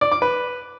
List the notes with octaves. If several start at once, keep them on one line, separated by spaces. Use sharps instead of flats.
D5
D6
B4